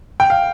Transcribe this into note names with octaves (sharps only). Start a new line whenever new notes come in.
G5
F5